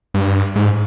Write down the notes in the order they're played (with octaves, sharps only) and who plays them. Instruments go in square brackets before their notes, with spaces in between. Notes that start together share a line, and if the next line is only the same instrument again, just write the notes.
[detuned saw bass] G2
G#2